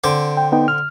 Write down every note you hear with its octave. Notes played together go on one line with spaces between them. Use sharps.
D3 C4 D6
G5
B3 D#4 G5
F6